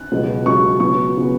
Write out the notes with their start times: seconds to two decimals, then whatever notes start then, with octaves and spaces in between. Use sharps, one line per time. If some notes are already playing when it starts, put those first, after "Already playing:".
Already playing: F#6
0.12 C#2 B2 F#3
0.46 C#2 B2 F#3 C#6
0.80 C#2 C#3 F#3 B3 C#6
1.17 C#3 F#3 B3